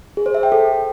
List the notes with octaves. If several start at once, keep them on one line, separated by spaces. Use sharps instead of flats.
G#4
C5
E5
G5
A4